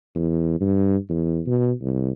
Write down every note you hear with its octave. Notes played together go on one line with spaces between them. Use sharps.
E2
G2
E2
B2
C2